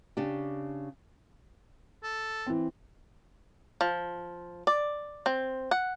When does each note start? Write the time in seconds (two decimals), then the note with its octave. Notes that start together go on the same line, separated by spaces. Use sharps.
0.17 C#3 D4 G4
2.04 A4
2.46 E3 C4
3.81 F3
4.67 D5
5.26 C4
5.71 F#5